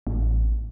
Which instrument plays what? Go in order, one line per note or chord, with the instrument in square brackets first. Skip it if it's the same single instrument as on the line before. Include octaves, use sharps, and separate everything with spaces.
[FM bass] A1